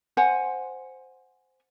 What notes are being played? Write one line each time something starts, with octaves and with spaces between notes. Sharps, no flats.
C5 F#5 G#5